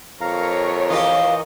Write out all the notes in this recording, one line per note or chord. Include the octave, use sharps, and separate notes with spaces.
F2 A#4 C#5 F5 A#5
E3 F4 G4 D#5